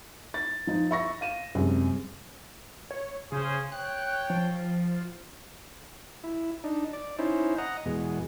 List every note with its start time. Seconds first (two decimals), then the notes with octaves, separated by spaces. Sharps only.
0.34 A6
0.67 F3 D#4
0.91 E5 C#6 A#6
1.21 F5 D#7 E7
1.55 F#2 C3 G3 G#3 C4
2.91 C#5
3.32 C#3 C#4 G#4 C5
3.72 C#5 G5 F#6
4.30 F3
6.24 E4
6.64 D4 D#4
6.93 D5
7.19 C#4 D#4 E4 C5
7.58 D#5 F#5 A#5
7.86 E2 B2 G#3